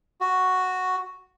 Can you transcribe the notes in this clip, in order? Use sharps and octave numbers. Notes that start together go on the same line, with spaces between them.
F#4